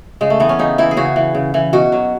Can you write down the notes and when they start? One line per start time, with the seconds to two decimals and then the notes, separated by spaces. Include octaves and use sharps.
0.21 C#3 G#3
0.30 A3
0.40 E3 B3
0.49 C#4
0.59 C#3 D#4
0.78 E3 E4
0.91 G#4
0.97 C#3 F#4
1.16 E3
1.35 C#3
1.54 E3
1.73 B2 F#4
1.92 F#3